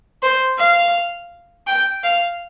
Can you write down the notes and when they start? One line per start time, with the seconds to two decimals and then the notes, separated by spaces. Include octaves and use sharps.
0.23 C5
0.58 F5
1.67 G5
2.03 F5